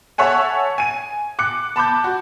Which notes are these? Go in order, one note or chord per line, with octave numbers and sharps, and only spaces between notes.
A4 C#5 E5 F#5 G#5
G#5 D#7
D6 F#6 C#7
A5 B5 D6 G6
F#4